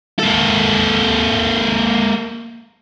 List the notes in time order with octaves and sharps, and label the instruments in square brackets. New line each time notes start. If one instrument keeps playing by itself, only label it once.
[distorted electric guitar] A#3 A4